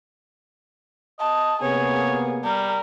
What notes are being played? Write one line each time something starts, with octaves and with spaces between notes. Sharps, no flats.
D#5 A5
C3 A#3 B3 G#4 C#5
G3 A#4